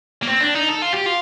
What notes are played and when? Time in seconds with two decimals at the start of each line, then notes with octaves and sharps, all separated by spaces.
0.23 A#3
0.27 C4
0.41 D4
0.55 D#4
0.69 A4
0.82 F4
0.94 G4
1.06 F4